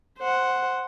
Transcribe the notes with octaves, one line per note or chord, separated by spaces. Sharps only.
C5 F#5